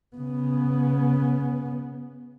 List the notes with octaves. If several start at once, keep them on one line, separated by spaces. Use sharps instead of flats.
C#3 B3